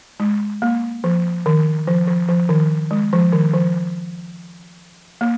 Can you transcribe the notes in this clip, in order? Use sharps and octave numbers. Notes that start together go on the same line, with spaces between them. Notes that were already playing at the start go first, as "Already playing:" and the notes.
G#3
A#3
F3
D#3
F3
F3
F3
D#3
G#3
F3
D#3
F3
A#3